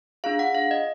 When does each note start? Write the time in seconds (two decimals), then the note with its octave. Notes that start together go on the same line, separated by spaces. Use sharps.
0.24 D4 F4 G#4 F5
0.39 F#5
0.55 F5
0.71 D#5